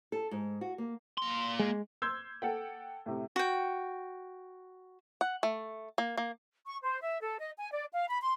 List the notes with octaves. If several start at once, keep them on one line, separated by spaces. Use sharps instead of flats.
A4
G#2
F#4
A#3
A#3 C6
G#3
C6 E6 G6 G#6
A4 F#5 G5
A2 C3
F#4 G5
F#5
A3
A#3
A#3
C#6
C5
E5
A4
D#5
G#5
D5
F5
B5
C6